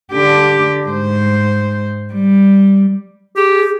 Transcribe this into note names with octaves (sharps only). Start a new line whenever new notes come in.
D3 G4
G#2 C5
G3
G4 G#4